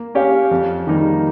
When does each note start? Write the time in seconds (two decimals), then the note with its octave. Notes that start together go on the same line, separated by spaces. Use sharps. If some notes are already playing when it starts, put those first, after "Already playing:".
Already playing: A#3
0.15 C#4 G4 C#5 F5
0.51 F2
0.87 D#3 G3 A#3 D#4